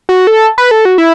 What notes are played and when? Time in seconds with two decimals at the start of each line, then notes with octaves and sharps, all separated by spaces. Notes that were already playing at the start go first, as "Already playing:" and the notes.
0.09 F#4
0.27 A4
0.58 B4
0.71 A4
0.85 F#4
0.98 E4